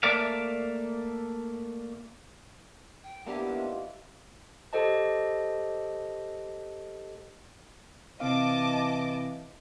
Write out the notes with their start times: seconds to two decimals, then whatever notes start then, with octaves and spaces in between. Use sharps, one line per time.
0.03 A3 A#3 D5 E5 F5
3.04 G5
3.26 B2 A#3 B3 D4 E4 G4 E5
3.47 G#2 F3 F5
4.73 G4 A4 C5 D#5 A5
8.20 C3 E3 C4 D#5 F5 A5 D6